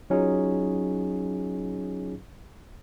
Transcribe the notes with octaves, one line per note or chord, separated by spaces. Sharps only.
F#3 C#4 D#4 F4 G#4